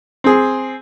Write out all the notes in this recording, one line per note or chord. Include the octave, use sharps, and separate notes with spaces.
C4 G#4